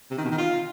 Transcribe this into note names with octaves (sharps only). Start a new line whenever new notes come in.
C3
D#3
B2
D#3
F4